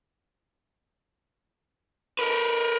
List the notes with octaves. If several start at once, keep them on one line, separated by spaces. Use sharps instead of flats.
A#4 B4